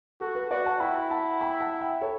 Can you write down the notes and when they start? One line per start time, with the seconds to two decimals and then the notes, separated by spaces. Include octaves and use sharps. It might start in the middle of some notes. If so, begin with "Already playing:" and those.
0.21 F#4 A4
0.35 B4
0.50 F#4 B4 D5
0.66 F#5 A5
0.80 E4 G5 B5
1.11 F#5 A5
1.41 G5 B5
1.60 F#5 A5
1.81 E5 G5
2.01 A4 C#5